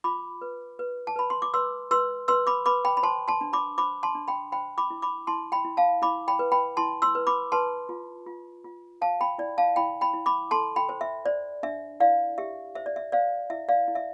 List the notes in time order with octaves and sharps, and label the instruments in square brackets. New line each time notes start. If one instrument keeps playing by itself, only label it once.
[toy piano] F4 B5 D6
B4
B4
A5
B4 B5
C6
D6
B4 C6 E6
B4 C6 E6
B4 C6 E6
B5 D6
B4 B5 D6
G5 B5
B5
C5 A5 C6
A5 C6
D4
B5 D6
C5 B5 D6
A5 C6
D4
G5 B5
C5 G5 B5
B5 D6
E4
B5 D6
E4 A5 C6
G5 B5
E4
F5 A5
E4 B5 D6
G5 B5
B4
G5 B5
E4 A5 C6
C6 E6
B4
B5 D6
B4 A5 C6
F4
F4
F4
C5 F5 A5
G5 B5
E4 D5
F5 A5
E4 G5 B5
G5 B5
E4
B5 D6
A4 A5 C6
G5 B5
C5
E5
C5 D5
D4 E5
E4 D5 F5
G4 E5
C5 E5
D5
E5
C5 D5 F5
E4 E5
D5 F5
E4
E5